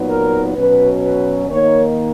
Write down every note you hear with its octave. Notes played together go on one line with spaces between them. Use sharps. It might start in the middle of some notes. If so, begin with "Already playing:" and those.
Already playing: A#2 F#3 B3 D#4
A#4
B2 F#3 C#4 B4
B4
D#3 A#3 D#4 C#5